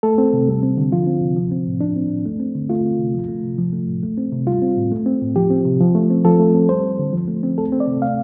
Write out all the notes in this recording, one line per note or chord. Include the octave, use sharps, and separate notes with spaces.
A3 A4
C4
C3
G3
C4
D3
F3 F4
C4
C3
F3
C4
A2
F3 D4
C4
A2
A3
C4
D3
A3 F4
C4
C3
F3
A3
C3
F3
A3
A2
A3
C4
C3
G3 F4
C4
A2
A3
C4
A2
F3 G4
C4
C3
F3
A3
C4
F3 A4
A3
C4
G3 C5
C4
D3
F3
A3
C4
A3 A4
C4
D5
C3
A3 F5